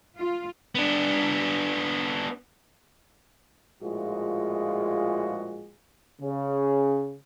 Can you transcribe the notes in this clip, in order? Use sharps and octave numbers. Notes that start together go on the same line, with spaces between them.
F4
B3 D4
A#1 A2 G#3 F4 F#4 G#4
C#3